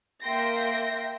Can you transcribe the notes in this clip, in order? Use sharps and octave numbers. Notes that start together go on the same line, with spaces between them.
A#3 E5 G5 C6 A#6